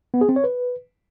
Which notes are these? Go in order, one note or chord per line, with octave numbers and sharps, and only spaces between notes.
B3
G#4
C4
C#5
B4